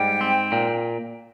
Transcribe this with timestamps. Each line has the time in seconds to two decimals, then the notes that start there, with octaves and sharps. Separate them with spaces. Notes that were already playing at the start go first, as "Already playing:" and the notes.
Already playing: G#2 G3 G5
0.21 C4
0.52 A#2